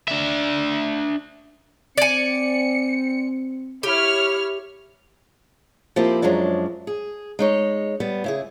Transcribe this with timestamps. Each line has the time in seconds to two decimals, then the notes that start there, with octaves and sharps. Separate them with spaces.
0.08 D4 E5
1.98 C4 D5 G#5 C#7
3.83 E4 G4 C#5 F6
5.96 F3 A#3 C4 E4 G4
6.22 F#2 F3 F#3 G#3 D4
6.87 G#4
7.39 G#3 D#4 C#5
8.00 G3 B3
8.24 C#3 E4 G#4